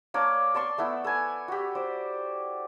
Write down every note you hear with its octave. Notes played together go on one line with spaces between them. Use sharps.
A#3 D4 C#5 D6
D5 A5 C6 C#6
A3 B3 E4
A4 B4 G#5
F#4 G4
C5 D5